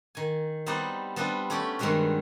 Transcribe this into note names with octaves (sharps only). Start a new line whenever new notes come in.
D#3 G#5
G3 B3 C4 D#4 C5 D5
G3 B3 C4 D4 F4
A3 C#4 G4 D5 G5
G2 D#3 G3 G#3 C4 F#4